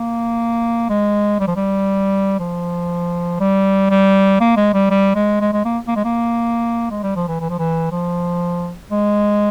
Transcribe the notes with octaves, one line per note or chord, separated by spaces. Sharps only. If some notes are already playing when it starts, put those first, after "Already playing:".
Already playing: A#3
G#3
G3
F3
G3
F3
G3
G3
A#3
G#3
G3
G3
G#3
G#3
G#3
A#3
A#3
G#3
A#3
G#3
G3
F3
E3
E3
F3
E3
F3
G#3